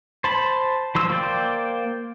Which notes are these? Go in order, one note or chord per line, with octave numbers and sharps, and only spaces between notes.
C5 A5 B5
F3 C5 E6
A#3 C5 D5 G5